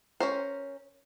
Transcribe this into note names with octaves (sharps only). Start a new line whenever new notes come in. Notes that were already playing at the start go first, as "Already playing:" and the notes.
C#4 A#4 C5